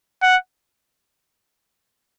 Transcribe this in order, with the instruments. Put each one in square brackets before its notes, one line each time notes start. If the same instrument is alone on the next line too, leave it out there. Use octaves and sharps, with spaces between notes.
[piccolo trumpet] F#5